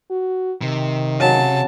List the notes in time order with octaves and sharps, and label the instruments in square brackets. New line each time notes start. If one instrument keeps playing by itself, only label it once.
[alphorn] F#4
[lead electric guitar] C3 [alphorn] D#3
[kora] C#3 F#3 [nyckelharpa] A5